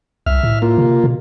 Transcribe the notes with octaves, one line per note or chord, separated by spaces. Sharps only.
C2 E5 F6
A2
A#3 F4
C3
B2